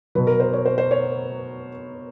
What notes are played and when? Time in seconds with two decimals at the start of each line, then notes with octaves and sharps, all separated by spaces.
0.15 B2 F#3 B4
0.27 A#4
0.40 C5
0.53 C#5
0.66 C5
0.78 C5
0.91 C#5